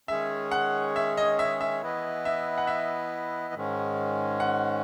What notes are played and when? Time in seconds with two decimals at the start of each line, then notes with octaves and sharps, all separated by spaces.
0.08 D#3 G#3 C#4 G#4 C#5 E5
0.51 F#5
0.96 E5
1.17 D#5
1.39 E5
1.61 E5
1.82 E3 B3 E4 B4 D#5
2.25 E5
2.58 F#5
2.67 E5
3.54 G#2 D#3 G#3 C#4
4.40 F#5